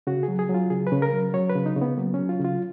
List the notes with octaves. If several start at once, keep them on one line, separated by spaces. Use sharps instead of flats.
C#3 F#4
G#4
F#3
G#4
F#3 F4
C#3 G#4
B4
C#3
A#4
F#3
F#3 C#5
B4
C#3
D#4
C#3
B3
F#3 A#3
F#3 C#4
F4
C#3
F4